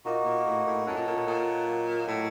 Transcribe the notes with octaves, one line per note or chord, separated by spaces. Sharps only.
A#2 A#3 D#4 F#4
A#2
A2
A2
F#2 D#4 A4 C#5 F#5
A#2
A#2
A#2
A#2
F#3 A#3 D#4 F#4
A2